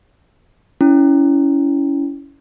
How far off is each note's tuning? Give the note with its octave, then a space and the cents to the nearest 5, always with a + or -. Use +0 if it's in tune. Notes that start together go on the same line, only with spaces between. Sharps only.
C#4 +20 E4 +0